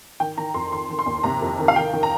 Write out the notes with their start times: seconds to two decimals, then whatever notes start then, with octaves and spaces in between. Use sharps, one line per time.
0.20 D#3 G5
0.37 D#3 A#5
0.54 F2 C6
0.72 D#3 C6
0.89 D#3
0.99 C6
1.06 D#2
1.24 C3 A#5
1.42 F2
1.59 D#3
1.68 F5
1.76 D#3 G5
1.93 D#3
2.03 A#5